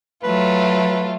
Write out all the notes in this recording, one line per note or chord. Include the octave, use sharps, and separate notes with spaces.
F#3 A3 F4 B4